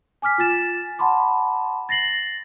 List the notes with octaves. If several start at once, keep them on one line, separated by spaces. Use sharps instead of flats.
G#5 D6 F6 B6
F4 G#5 A6 E7
F#5 A5 B5 C6 D6
A6 A#6 C7 F#7